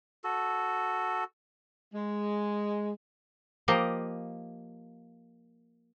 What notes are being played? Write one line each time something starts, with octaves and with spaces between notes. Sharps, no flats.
F#4 A4
G#3
F3 A#3 G4 D#5